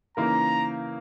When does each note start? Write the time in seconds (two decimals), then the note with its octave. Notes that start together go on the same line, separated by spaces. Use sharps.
0.17 C#3 E3 A#3 D#4 A#4 A#5